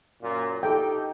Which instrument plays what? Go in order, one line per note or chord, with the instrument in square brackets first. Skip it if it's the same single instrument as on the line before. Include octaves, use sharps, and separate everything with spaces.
[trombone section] F#2 A#2
[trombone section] D#4 G4 [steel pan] A4 G5